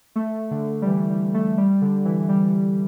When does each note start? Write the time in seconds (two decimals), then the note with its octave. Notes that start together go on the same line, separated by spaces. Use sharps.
0.16 A3
0.51 D3
0.82 G3
0.87 E3
1.10 G3
1.34 A3
1.58 G3
1.82 D3
2.05 E3
2.29 G3